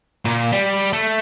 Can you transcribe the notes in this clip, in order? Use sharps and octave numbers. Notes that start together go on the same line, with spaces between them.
A#2
G3
A3